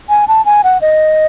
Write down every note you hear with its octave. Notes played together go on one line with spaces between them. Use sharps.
G#5
A5
G#5
F#5
D#5